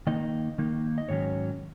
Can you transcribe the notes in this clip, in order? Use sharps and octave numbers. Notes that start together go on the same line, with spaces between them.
D#3 A#3 D#4 D#5
D#3 A#3 D#4
D#5
G#2 D#3 F#3 C#4 C#5